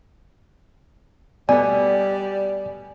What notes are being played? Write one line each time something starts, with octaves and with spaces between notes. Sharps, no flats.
B2 G3 A3 B3 D5 G#5